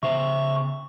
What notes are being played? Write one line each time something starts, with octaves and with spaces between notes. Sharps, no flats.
C#3 C5 E5 C#6